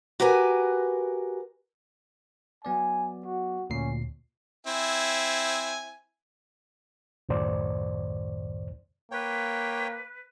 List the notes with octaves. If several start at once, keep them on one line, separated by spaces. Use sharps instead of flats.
F#4 G4 A#4 B4 G#5
F#3 B3 D5 G#5
F#4
D2 A#2 C#4 C7
C4 E4 G#5
C#2 F#2 A2 D#3 C5 D5
A#3 B4 C#5 G5